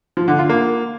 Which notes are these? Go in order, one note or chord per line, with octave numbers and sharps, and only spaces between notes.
F3
D3
F4
A#3